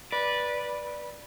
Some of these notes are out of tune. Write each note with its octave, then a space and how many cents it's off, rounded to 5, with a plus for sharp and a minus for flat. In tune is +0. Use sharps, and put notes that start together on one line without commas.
B4 -15 D5 +0